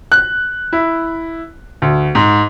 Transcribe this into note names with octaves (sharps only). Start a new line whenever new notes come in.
F#6
E4
D2
G#2